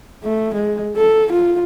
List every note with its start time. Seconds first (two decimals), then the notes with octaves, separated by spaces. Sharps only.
0.24 A3
0.54 G#3
0.96 A4
1.32 F4